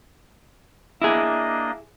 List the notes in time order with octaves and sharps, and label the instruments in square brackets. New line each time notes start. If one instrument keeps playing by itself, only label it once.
[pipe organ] A#3 D4 D#5 [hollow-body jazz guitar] E4 G#4